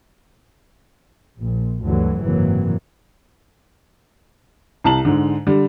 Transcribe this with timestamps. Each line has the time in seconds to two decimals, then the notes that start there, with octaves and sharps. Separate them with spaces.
1.40 A#1 A#2
1.85 D2 G2 D3 E3 F#3
2.22 F#1 G#2 C3 E3 F#3 A#3
4.84 C2 A5 F#7
5.05 G#2 D3
5.47 D3 G3